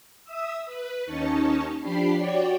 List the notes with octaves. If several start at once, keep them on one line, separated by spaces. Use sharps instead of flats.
E5 D#6 E6
B4
D#2 C#4 D#4 A5 C#6
F3 D4 G4 B5 C7
F#4 C#5 D5 G5